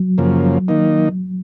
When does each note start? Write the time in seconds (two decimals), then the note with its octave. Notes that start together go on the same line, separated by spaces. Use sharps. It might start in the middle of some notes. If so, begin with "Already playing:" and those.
Already playing: F#3
0.18 F#2 C#3 F3 A#3
0.68 D#3 A#3 D#4